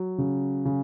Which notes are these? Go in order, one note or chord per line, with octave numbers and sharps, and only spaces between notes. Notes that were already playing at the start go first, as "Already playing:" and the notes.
Already playing: F#3
C#3
C#3